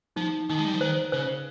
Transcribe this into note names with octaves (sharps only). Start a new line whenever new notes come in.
F3 D#4
D#3 D#4
G#3
G3
F3
D#3 C5
C#3 C5